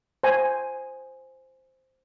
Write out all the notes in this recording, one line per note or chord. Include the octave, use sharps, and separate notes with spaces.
C5 G#5